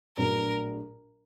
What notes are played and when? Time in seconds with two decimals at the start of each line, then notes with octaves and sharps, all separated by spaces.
0.17 A#1 A2 F#3 B3 D4 A#4